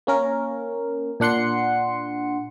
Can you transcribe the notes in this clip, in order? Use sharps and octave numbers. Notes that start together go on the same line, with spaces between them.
A#3 C#4 A#4
A#2 D4 F#5 C6 C#7